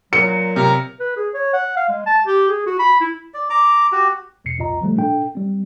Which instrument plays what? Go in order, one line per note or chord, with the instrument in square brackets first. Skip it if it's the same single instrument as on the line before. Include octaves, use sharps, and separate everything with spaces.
[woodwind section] A#2 F#3 [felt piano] C#7
[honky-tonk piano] C3 [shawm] A#4
[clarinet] B4
G#4
C#5
F#5
F5
G#3
A5
G4
G#4
F#4
B5
E4
[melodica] D5
A#5 D6
F#4 G4
[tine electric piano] A1 E2 B2 C7 C#7
C2 F2 A#2 F4 D#5 A#5
D3 F3 G3 A3
A#2 D4 A4 G5
G3 C4